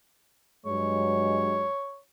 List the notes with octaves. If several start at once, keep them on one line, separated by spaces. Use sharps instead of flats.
G2 F#3 G#3 C#5